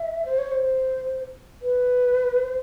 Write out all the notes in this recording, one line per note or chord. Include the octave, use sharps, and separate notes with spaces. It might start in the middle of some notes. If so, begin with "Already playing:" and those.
Already playing: E5
C5
C#5
C5
B4
C5